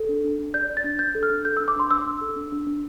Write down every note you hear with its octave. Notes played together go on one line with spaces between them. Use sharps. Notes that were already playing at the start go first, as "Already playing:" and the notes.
Already playing: A4
D4
D4
D4
D5 G6
D5
A6
D4
D4 G6
A4
F6
D4
A4 G6
D4 E6
D6
D4 C6
D4 E6
D4
A4
D4
D4
D4